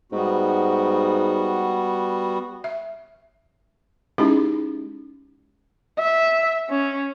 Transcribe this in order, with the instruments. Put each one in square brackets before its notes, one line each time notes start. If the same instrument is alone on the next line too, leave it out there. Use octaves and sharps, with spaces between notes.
[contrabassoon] G#2 [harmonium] G3 B3 F#4
[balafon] E5
G#3 C#4 D#4 E4 G4 G#4
[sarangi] E5
C#4